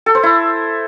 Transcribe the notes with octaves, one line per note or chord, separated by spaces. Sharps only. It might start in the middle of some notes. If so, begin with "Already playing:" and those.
A4
C5
E4